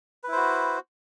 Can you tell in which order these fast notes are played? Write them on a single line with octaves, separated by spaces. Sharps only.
B4 E4 C5 F#4